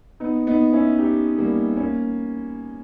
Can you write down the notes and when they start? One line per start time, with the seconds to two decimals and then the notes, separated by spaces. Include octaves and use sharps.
0.20 B3 D#4
0.47 B3 D#4
0.73 C#4 E4
0.99 D#4 G4
1.38 G3 A#3
1.77 A#3 C#4